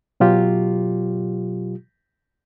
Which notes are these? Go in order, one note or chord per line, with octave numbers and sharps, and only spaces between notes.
B2 F#3 F4 G4